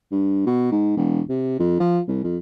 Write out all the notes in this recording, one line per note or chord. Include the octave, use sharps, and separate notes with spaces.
G2
B2
G#2
E1
C3
F2
F3
C2
F2